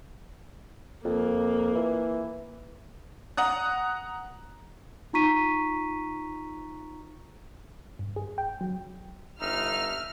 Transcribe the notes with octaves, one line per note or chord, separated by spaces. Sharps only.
F2 A#3
E3
F#5 A#5 D#6 F#6
D#4 F4 A#5 C#6 B6 D#7
G2
G#4
G5
F#3
G1 D#4 E5 F6